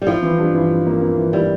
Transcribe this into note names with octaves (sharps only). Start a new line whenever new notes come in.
G3
F3 E4
E3
G2
E3
G2
A#3
A#3
E3
G3 E4